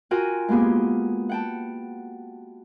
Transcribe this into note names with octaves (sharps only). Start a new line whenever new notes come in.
F4 F#4 A#4 G5 G#5
G#3 A#3 B3 G4 G#4
F#5 G5 A5